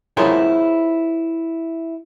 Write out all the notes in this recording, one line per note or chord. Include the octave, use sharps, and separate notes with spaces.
E4 F4 G#4 A#4 C5 C#5